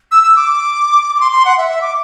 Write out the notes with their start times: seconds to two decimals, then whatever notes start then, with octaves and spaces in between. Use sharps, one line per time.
0.12 E6
0.23 E6
0.36 D6
1.15 D6
1.20 C6
1.32 C6
1.45 F#5
1.58 E5
1.69 E5
1.82 D6